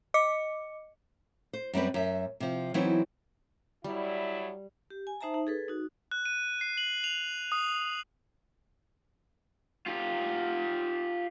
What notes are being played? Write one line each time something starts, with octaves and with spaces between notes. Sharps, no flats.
D#5 D6 C#7
C5
F#2 G3 C4 B4
F#2 E5
C3 F3
E3 F#3 B3 C4 D#4 E4
A2 F#3 G3 E4
G4
G#5
D#4 C5 E5 A5 A#5
D#4
G#4 A4 B4
D#4 F#4
F#6
D#7
C7
F#7
F7
D#6
F4 G4